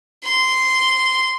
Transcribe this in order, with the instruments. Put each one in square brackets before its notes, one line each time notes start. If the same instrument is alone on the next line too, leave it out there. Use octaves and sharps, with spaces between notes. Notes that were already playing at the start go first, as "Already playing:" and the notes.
[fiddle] C6